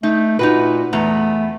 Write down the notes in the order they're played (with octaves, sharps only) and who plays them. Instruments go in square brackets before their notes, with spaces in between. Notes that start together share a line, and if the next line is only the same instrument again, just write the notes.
[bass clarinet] A3 [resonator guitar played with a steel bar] D#4
[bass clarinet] A#2 [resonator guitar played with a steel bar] D#4 F#4 B4
[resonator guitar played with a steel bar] E2 B3 A#5 [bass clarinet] A3